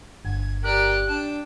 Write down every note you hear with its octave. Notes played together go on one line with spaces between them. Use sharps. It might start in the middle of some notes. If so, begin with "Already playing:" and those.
G1 G#6
G4 A#4 D5 F#6
D4 G5 A5